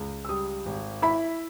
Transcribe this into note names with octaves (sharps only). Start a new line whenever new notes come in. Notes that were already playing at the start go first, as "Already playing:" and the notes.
Already playing: C#2
E6
G3 D#6
G#1
E4 B5